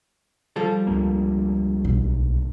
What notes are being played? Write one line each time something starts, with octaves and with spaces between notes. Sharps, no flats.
F3 G3 A4
C#2 G2 A#3
B1